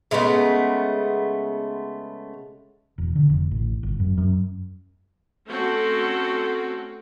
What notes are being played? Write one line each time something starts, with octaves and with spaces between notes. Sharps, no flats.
C#3 G#3 A3 B3
E1
D3
F1
A1
G1
F#2
F#2
A3 C4 C#4 F#4 A4